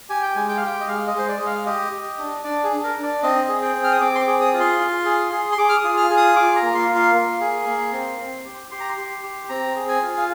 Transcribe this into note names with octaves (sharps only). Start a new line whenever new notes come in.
G4 G#5
G5
G#3 G#5
G5
F5
G4 G5
D#5
G#3 F5
D#5
G#3 C5
D5
G#3 D#5
F5
G4 D#5
G4
D4
D4 D5
G#4
D4
A#4
D4
D5
C4 D#5
G#4
G5
C4
F6
D#6
C4 D6
C6
D6
G#4
D#6
F4
C6
F4
G#4
G#4
C6
G#4 D6
F6
D#6
F4
F6
G#4
D#6
F4 D6
A#5
A#3
C6
F4
C6
A#3
G#4
A#3
C4
C4
G4
G4 C6
A#5
C6
G4
G4
C4 A#5
G#4
G#5
F4
F5